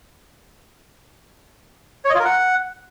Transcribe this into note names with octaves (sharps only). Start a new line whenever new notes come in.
C#5
D#5
F4
A#4
F#5